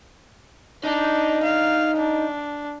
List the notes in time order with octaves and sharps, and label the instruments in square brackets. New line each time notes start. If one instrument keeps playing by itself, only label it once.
[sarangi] D4 [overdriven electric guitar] D#4
[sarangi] F5
D4